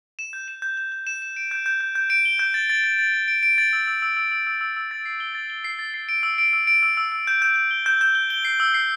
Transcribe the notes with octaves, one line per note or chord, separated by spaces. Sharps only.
E7
G6
E7
G6
G6
G6
E7
E7
D7
G6
G6
G6
G6
D7
G7
G6
A6
A6
A6
A6
D7
D7
D7
A6
E6
E6
E6
E6
E6
E6
E6
E6
A6
C7
G7
A6
G7
C7
A6
C7
D7
E6
D7
E6
D7
E6
E6
E6
G6
G6
G6
G7
G6
G6
G7
G7
C7
E6
C7